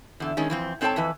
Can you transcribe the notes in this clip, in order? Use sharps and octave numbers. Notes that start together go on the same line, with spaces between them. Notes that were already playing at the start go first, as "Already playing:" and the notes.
E2 D3
D#3 G#3 C#4
E3 F3 C4
G#2 C4 A4 C#5 G5 A5
F2 E3 B4